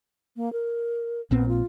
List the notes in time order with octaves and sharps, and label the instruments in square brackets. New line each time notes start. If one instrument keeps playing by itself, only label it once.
[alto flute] A#3
A#4
[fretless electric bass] A#1 A#2 C4 [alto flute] B3
[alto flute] F4